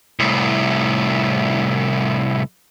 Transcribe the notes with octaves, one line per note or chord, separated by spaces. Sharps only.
C2 A2